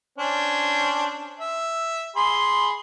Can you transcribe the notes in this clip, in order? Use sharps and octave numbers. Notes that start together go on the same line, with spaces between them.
C#4 D4 C5
E5
G#4 B5 C6